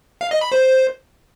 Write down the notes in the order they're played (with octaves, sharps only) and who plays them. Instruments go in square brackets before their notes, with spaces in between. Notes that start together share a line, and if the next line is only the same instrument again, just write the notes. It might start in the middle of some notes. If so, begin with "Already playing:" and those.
[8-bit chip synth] F5
D#5
B5
C5